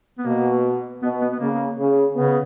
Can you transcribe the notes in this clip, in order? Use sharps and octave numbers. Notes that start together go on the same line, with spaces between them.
B3
B2 A#3
B2 B3
B3
B3
C#3 A#3
C#3
C#3 B3